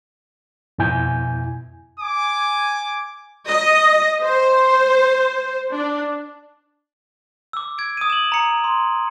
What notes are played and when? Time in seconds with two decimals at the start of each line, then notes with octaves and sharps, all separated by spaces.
0.79 F2 B2 E4 G#5 G6
2.00 G#5 D6
3.49 D#5
4.23 C5
5.71 D4
7.53 D6 E6
7.78 G#6 D7
7.97 D#6 D#7
8.10 E7 F#7
8.32 A#5 C#7
8.64 C6